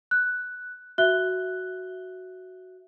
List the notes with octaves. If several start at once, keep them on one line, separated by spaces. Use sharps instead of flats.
F#6
F#4 E5 F#6 G7